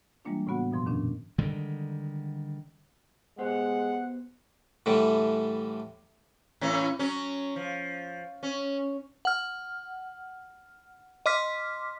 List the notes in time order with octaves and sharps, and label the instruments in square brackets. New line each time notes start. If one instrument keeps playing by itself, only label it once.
[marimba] E3 G3 G#3 A#3 D4 F4
A2 C#3 B3 F#4 F#5
G2 B2 F3 C6
F2 A#2 D#3 C#4 D4
[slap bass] D3 D#3 G3 G#3
[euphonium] G#3 [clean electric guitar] B3 G4 C5 [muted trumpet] F#5
[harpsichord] A2 D3 E3 G3
[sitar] A2 E3 C#4
F#3 C#4
F3
C#4
[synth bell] F#5 F6
D#5 C6 D6 F6 B6